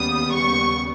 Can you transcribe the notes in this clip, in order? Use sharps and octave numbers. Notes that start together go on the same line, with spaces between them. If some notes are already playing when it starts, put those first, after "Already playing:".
Already playing: D#2 C#3 G3 B3 D#6
C#6